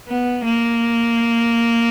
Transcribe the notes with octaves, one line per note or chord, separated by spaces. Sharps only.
B3
A#3